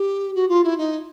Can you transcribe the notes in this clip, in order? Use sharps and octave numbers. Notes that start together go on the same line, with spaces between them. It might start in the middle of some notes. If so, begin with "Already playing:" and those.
Already playing: G4
F#4
F4
E4
D#4